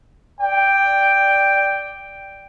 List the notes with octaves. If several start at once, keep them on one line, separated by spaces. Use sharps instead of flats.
D5 G5